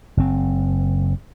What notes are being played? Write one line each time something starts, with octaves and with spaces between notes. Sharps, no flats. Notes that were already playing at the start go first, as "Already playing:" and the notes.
F#1 C4